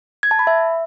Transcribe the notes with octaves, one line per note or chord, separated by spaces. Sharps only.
G#6
A5
B5
E5